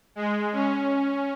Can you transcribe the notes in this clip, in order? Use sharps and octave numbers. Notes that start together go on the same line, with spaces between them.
G#3
C#4